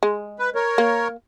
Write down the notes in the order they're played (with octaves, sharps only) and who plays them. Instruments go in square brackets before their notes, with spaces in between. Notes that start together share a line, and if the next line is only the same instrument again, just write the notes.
[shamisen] G#3
[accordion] B4
A#4 C#5
[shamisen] A#3